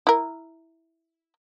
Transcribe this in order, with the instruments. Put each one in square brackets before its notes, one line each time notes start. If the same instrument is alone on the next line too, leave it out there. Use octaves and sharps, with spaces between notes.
[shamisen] E4 A#4